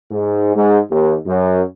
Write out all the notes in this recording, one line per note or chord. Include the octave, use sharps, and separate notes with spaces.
G#2
G#2
D#2
F#2